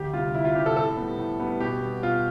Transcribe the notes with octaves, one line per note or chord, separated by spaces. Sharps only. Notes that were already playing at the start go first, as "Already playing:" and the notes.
Already playing: D2 G4
C3 G3 F4
D2 E4
F4
C3 G3 G4
A4
A2 A4
G3 B3
A2
G3 B3
B2 G4
G3 B3
B2 F4